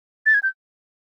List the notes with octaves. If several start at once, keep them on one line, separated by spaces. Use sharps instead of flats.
A6
G#6
G6